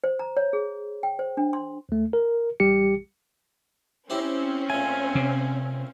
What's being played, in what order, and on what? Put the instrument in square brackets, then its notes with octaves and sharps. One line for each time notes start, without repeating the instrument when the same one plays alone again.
[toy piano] C5
A#5
C#5
G#4
G5
C5
D4
C6
[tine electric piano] D2 A3
A#4
A1 G3 G4 C#7
[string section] C4 C#4 [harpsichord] E4 G4 C5
[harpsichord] A#2 A3 [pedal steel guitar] G#5
[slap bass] C3